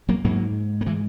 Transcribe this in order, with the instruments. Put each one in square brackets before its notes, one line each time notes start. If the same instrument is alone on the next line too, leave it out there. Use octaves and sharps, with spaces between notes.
[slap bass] F#3 A#3
G#2 F#3 A#3
A#3
E3 G#3